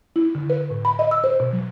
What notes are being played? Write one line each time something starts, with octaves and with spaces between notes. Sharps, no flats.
E4
D3
B4
A2
B5
D#5
E6
C5
B2
F#3